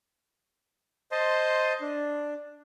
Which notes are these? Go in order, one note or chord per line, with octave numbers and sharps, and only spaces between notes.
C5 D#5 A5 C6
D4